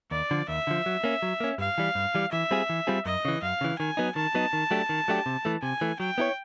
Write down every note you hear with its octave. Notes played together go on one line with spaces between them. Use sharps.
D#2 D5
D3 F3
D#2 E5
D3 F3
F#3
A#3 C#4
F#3
A#3 C#4
G2 F5
E3 G3
G2
E3 G3
E3 E5
G3 C4 F4 G#4
E3
G3 C4 F4 G#4
F#2 D#5
C#3 E3
F#2 F5
C#3 E3
D#3 G#5
F#3 B3 D#4
D#3 A5
F#3 B3 D#4
D#3
F#3 A3 D4 G4
D#3
F#3 A3 D4 G4
C3
E3 A3
C3 G#5
E3 A3
F#3 G5
B3 E4 A4 C#5